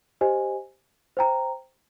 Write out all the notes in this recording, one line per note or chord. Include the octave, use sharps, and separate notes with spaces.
G4 C5 D#5 G#5
C5 G5 A#5